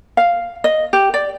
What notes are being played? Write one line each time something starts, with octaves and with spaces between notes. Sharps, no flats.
F5
D#5
G4
D5